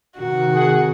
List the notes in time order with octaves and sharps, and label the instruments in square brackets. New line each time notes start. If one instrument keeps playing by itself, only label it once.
[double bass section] C3 D#3 [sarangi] F#4
[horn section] G#4 F#5